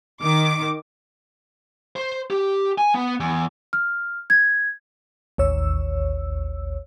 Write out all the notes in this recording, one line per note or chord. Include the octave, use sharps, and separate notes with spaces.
D#3 D6
C5
G4
G#5
B3
E2
F6
G#6
A1 D#2 C#5 E6